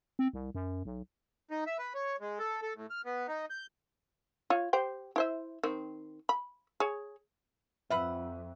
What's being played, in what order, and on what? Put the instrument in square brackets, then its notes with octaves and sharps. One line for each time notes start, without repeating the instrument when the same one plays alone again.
[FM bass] C4
C2
F#2
B1
[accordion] D#4
E5
B4
C#5
G#3
A4
A4
A2
F6
B3
D#4
G6
[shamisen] F4 C#5
G4 C5 G5
E4 C5 E5
D#3 C4
B5
G#4 C#5
[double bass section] F2 [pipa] F4 B4 F#5 [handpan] E5